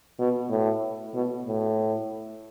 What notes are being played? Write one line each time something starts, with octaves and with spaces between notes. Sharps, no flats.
B2
A2
B2
A2